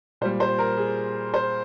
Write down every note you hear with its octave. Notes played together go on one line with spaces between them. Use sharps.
A#2 G3 C5
C5
A#4
G#4
C5